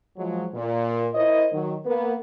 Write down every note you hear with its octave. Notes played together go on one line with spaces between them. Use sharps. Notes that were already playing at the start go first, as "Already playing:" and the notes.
F3 F#3 G#3
A#2
E4 A#4 C5 C#5 D#5
D#3 F#3
A#3 B3 B4